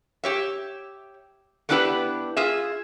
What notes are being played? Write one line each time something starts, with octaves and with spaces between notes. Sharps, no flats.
G4 C#5 E5
A3 B3 D4 E4 G4 B4
F4 G#4 E5